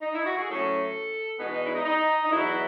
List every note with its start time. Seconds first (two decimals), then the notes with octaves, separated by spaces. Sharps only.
0.01 D#4
0.14 E4
0.25 F#4
0.37 G#4
0.50 A2 F#3 A3 C#4 A4
1.39 E2 B2 G#3 B3 D#4
1.51 D#4
1.63 E4
1.74 D#4
1.86 D#4
2.25 D#4
2.30 E2 B2 F#3 E4